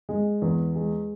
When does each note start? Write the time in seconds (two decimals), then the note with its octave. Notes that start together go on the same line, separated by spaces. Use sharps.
0.09 G#3
0.42 E2
0.75 G#3